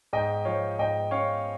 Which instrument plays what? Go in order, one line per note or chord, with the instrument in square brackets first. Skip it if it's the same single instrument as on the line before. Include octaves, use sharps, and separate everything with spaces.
[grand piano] G#2 D#5 G5
F3 C#5 F5
G#2 D#5 G5
C#4 C#5 F5